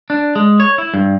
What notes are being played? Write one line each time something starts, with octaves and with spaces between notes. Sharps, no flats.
D4
G#3
C#5
E4
G2